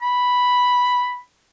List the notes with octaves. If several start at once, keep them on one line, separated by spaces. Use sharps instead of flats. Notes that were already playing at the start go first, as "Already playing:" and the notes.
B5